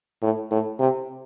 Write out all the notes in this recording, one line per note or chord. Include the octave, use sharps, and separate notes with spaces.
A2
A2
C3